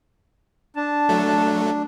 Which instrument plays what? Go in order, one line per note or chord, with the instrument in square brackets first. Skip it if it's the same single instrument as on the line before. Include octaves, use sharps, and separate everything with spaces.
[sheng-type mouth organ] D4 [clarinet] A5
[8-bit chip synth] F#3 A3